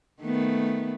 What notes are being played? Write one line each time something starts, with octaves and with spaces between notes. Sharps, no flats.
D#3 A3 B3